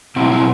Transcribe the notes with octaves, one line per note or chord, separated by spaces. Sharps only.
B2 F#3 C4 E4
C4 E4